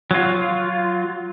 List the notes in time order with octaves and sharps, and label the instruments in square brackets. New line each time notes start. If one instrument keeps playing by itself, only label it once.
[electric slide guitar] F#3 F4